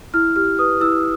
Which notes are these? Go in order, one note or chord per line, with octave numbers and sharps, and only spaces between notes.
E4 F6
G4 F6
B4 D#6
E4 E6